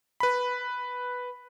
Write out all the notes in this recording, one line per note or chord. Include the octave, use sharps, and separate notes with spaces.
B4 B5